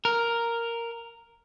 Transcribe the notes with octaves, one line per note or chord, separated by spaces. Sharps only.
A#4